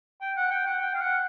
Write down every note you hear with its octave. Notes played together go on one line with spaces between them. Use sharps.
G5
F#5
G5
F#5
G5
F5
F#5